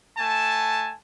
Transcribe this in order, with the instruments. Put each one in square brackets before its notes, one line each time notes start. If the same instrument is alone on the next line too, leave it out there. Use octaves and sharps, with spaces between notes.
[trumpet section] A3 G#5 A5